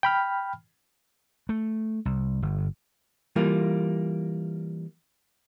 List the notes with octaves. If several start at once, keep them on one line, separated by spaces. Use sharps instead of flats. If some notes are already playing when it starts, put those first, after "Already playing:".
G5 B5 F6
A3
C2
G1
E3 G3 A#3 F4